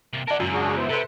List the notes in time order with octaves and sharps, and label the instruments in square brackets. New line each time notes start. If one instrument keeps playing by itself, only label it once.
[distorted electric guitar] C3 A#3
[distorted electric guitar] A#4 F#5 [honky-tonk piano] D5 A5
[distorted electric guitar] C#2 A#2 [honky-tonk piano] F#2
[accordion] D4 F#4 G#4
B3 E4 C5
[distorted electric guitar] C3 [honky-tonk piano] A4 C5 [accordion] B4 E5